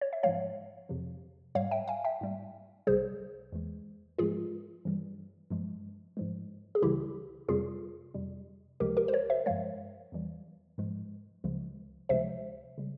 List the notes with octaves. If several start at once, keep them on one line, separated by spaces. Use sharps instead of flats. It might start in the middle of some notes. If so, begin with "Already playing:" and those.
C#5
E5
G#2 F3 G#3 C#5 F5
F2 C3 F3
G#2 G3 C#5 F5
E5 G5
F5 G#5
E5 G5
G#2 G3
C2 C3 G3 G#4 C5
E2 E3 G#3
G#2 F3 G#3 F4 G#4
G2 E3 G3
G2 F3 G#3
G#2 F3 G#3
G#4
C#2 C#3 E3 G3 E4 G4
F2 C3 G3 F4 G#4
F2 C3 G3
C#2 C3 F3 G#3 G4 A#4
G4 A#4
C5
A#4 C#5
C5 E5
G2 F3 G#3 C#5 F5
E2 E3 G3
G#2 F3 G#3
C#2 C#3 F3 G#3
C#2 C3 F3 G#3 C5 E5
C#3 G3